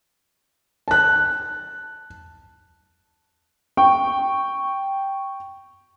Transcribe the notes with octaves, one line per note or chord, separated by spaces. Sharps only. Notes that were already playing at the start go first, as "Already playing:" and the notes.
A5 F#6
G5 C#6